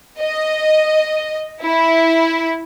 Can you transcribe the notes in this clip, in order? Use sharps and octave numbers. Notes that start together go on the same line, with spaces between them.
D#5
E4